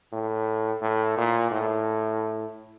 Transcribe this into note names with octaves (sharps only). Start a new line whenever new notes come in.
A2
A2
A#2
A2